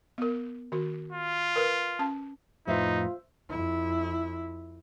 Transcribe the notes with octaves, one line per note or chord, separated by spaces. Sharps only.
B3 A#4
D#3 F#4
F4
A#4 B4
C#4 A5
F2 A2 D#4 F4 B4 C5 E5
F2 E4